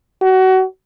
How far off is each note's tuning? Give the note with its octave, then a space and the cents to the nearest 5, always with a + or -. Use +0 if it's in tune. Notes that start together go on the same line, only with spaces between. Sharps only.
F#4 +25